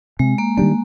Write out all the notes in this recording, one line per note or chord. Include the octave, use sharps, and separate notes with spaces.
C3 G#3
A#3
D#3 G3 A#3 D4